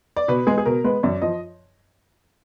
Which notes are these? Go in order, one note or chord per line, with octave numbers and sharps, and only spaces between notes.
D5
B2 B4
G#3 B3 G#4
G#4
B2 A#4
G#3 B3 B4
F#2 D5
F3 D#5